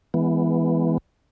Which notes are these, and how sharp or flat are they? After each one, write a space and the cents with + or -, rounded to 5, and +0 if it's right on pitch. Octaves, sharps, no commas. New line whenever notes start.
E3 +0 G#3 +0 B3 +5